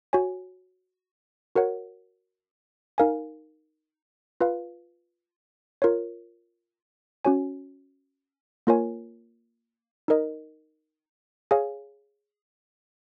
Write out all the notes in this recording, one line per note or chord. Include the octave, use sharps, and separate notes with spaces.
F#4 C#5 G#5
F#4 A#4 C#5 F#5
D#4 A#4 F5 G#5
F4 B4 F5
F4 A#4 C#5
C#4 F#4 C#5 G#5
A#3 F4 A#4 C#5 G#5
D#4 A#4 D#5
G#4 C#5 F5 G#5